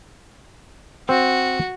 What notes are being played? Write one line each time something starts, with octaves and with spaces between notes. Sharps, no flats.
C4 F#4